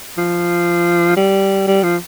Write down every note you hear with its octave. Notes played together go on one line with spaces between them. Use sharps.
F3
G3
G3
F3